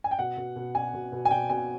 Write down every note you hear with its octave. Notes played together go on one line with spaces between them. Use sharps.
G#5
G5
B2 F#5
B2
B2
B2 G#5
B2
B2
G#5
B2 G5
B2 G#5